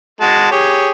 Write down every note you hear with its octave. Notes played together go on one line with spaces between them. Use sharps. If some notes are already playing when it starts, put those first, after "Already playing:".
G#3 F#4 A5
G4 G#4 C#5